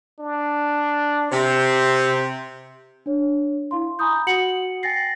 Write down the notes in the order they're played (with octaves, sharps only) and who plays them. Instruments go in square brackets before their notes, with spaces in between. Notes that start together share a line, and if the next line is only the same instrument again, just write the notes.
[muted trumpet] D4
[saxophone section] C3 [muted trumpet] C5
[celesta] D4 C#5
E4 F5 C6
G#5 A#5 B5 D#6 G6
F#4 F#5 C#7 F#7
G5 G#5 A6 A#6 C7